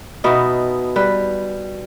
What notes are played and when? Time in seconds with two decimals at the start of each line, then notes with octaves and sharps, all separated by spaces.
0.24 B2 B3 D#4 E5
0.96 G3 B4